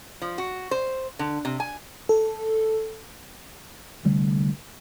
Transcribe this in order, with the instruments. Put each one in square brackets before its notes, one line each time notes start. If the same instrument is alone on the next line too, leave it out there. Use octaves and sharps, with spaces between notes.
[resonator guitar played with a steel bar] F3
F#4
C5
D3
C3
G#5
[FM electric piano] A4
[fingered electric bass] C2 D3 G3 A3